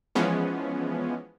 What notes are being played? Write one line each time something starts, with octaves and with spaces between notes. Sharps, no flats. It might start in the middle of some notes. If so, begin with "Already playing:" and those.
E3 F3 G#3 B3 C#4